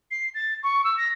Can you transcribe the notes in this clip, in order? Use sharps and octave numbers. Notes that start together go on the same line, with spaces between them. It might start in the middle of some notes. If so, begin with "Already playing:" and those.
C7
A6
C#6
E6
A#6